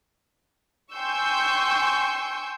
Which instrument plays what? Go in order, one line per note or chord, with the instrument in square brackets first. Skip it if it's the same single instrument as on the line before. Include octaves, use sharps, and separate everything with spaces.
[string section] G5 G#5 C6 C#6 E6 G6